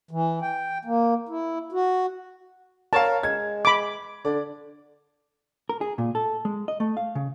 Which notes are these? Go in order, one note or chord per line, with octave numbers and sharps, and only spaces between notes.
E3
G5
A#3
E4
F#4
A#4 C#5 F5 A5
G#3 G#6
B5 D6
D3 D5
A#4
G#4
A#2
A4
G#3
D#5
A3
F5
C#3